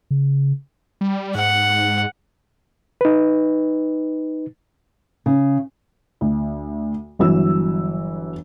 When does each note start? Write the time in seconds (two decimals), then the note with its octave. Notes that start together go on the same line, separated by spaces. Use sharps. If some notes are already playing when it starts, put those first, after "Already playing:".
0.11 C#3
1.01 G3
1.35 G#2 F#5
3.01 D#4 B4
5.26 C#3
6.21 D2
7.19 G1 E3 F#3 E6